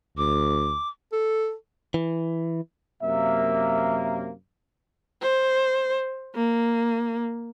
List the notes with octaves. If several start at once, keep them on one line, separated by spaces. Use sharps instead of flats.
D2 D6
A4
E3
F#2 C3 A#3 E5
C5
A#3